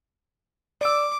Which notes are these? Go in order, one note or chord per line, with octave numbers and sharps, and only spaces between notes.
D5 D6 E6